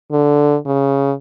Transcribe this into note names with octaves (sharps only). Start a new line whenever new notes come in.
D3
C#3